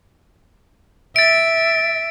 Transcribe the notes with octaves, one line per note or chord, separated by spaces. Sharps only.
E5 A6 D7